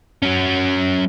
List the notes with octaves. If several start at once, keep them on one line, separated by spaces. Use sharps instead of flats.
F#3 C#4